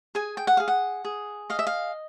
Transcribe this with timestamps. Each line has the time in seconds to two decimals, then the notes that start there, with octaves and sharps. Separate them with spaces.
0.15 G#4 G#5
0.37 G5
0.47 F#5
0.57 G#4 F5
0.68 F#5
1.05 G#4
1.50 D#5 F5
1.59 E5
1.67 F5